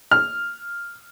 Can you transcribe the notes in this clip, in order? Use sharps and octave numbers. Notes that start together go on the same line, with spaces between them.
F6